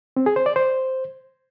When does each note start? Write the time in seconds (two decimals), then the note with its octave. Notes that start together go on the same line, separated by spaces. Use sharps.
0.17 C4
0.26 G#4
0.36 C5
0.46 D5
0.56 C5